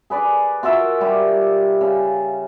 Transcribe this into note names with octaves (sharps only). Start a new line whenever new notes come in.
G#4 B4 D5
F4 F#4 A#4 E5
G3 G4
C#3